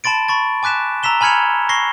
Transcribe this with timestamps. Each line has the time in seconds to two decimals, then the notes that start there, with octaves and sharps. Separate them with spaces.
0.04 A5 B5 C6 A6 D7
0.28 B5 C#6 A6
0.63 G#5 D6 F#6 B6 E7
1.03 A#5 E6 B6 E7 G7
1.21 G#5 B5 F6 G#6 C#7 F7
1.69 C#6 A#6 C7 G7